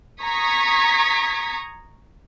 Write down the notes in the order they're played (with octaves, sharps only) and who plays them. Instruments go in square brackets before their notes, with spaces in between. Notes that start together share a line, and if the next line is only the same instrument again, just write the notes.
[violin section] A#5 C#6 D#6 G#6 B6